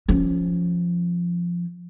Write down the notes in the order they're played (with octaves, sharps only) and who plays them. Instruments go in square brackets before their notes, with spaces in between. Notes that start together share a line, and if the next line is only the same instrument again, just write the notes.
[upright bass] F3 C#4